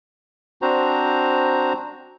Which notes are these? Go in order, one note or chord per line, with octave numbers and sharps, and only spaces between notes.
C4 D4 F#4 C5 A#5